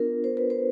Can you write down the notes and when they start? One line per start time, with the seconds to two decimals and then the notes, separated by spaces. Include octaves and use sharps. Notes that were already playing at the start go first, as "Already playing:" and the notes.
Already playing: B3 D4 F4 A#4
0.24 C5
0.37 B4
0.50 C5